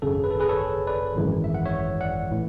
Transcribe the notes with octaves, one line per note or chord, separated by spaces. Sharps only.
G#1 F#2 C#3 A4
B4
A4
G#4 B4
A4 C#5
B4 D5
G#1 F#2 E3 G#3
E5
F#5
C#5 E5
D5 F#5
A2 E3 A3